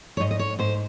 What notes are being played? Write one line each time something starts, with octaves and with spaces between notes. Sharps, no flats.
C#5
G#2 D#5
D#5
C#5
G#2 C5